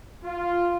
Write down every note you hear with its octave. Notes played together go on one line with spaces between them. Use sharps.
F4